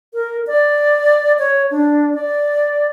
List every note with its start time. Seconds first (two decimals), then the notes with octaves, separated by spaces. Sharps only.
0.14 A#4
0.47 D5
1.39 C#5
1.71 D4
2.14 D5